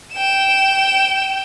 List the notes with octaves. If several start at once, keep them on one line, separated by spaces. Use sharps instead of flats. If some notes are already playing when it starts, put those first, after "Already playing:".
G5 E7